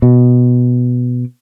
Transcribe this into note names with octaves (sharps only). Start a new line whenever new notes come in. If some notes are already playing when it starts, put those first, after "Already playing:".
B2